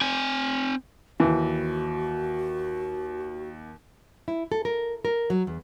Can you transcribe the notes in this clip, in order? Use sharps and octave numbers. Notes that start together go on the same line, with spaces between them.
C4 G#5
D#2 E3 F#4
E4
A4
A#4
A#4
F#3
E2